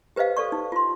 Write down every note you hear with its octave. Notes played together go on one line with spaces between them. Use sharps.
G4 B4 C5 D#5 F5
A4 D5 C#6
D#4
F4 C6